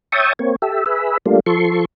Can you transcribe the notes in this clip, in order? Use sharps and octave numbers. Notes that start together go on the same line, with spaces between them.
C#5 E5 G5 A5 C#6 D#6
A#3 C4 C#5
G4 A4 E5
G#4 B4 E5
G3 A3 A#3 D4 F4
F3 A4 C6 C#6